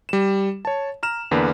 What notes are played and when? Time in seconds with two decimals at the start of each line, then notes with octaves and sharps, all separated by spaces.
0.09 G3 E7
0.65 C#5 A5
1.03 A#5 F6 E7
1.31 E2 D3 A#3 D4 B4